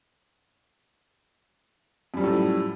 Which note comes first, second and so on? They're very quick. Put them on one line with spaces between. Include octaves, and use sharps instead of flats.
F#2 G3 F3 A2